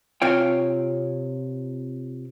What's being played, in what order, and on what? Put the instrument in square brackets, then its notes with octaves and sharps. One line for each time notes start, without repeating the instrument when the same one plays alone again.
[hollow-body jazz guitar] C3 F4 C#5 G5